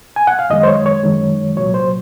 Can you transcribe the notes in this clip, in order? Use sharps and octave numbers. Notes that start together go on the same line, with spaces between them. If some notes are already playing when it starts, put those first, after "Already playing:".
G#5
F#5
F5
F#2 D#3 G#3 D#5
C5
C#5
C#5
F#2 D#3 G#3
C2 A#2 F#3 C#5
C5